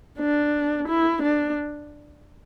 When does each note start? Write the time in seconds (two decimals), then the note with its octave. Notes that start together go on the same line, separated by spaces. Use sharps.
0.19 D4
0.88 E4
1.22 D4